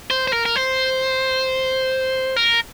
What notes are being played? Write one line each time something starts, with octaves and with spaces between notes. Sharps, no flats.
C5
C5
A#4
A#4
C5
A#4